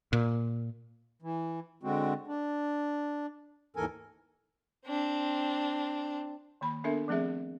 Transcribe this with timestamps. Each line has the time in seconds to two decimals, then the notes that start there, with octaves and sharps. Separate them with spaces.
0.13 A#2
1.22 E3
1.83 D3 G#3 C4 F#4
2.27 D4
3.76 D#2 G#2 E3 A4 A#4 G#5
4.86 C4 D4
6.61 D#3 A#3 B5
6.84 B3 D4 A4 A#4 E5
7.08 F3 A3 C4 G#4 E5